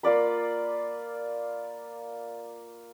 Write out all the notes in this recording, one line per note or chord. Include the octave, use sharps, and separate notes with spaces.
A#3 F4 D5 B5